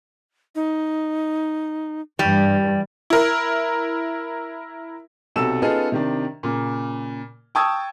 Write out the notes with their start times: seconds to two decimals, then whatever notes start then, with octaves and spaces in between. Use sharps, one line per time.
0.55 D#4
2.19 G2 E3 G3
3.10 E4 A#4
5.36 B1 C3 F#4 A4 E6 E7
5.62 B3 C#4 D#4 F4 G#4 A4
5.92 C3 D#3 D4
6.43 A#2 C#3
7.55 G5 A5 C#6 D#6 E6 G#6